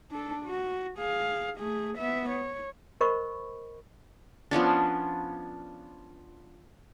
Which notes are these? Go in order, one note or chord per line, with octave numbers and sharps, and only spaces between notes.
D4 A4
F#4
G#4 F5
A3 G#4
B3 E5
C#5
A#4 C5 D#5 B5 C#6
F3 B3 C#4 D4